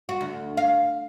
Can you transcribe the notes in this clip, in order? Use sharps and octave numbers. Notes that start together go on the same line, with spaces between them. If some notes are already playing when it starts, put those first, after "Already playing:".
F#4
D2
F5